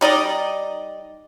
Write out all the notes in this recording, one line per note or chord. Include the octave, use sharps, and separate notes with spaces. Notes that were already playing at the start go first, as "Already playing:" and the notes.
G3 D#4 D5 D#5